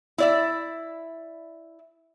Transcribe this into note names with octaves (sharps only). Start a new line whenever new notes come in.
E4 D5 E5